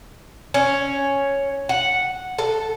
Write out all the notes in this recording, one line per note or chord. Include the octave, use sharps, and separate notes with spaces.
C#4
F#5
A4